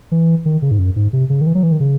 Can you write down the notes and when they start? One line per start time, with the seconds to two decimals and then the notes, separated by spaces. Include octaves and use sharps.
0.12 E3
0.46 D#3
0.62 C#3
0.71 G#2
0.79 F#2
0.96 G#2
1.13 C3
1.30 C#3
1.41 D#3
1.47 E3
1.55 F#3
1.63 E3
1.72 D#3
1.80 C#3